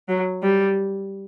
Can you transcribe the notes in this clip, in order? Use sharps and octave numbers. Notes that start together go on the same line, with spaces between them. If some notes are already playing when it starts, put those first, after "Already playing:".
F#3
G3